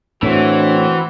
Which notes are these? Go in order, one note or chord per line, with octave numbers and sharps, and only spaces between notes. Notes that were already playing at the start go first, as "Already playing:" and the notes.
A2 E3 C4 D4 F#4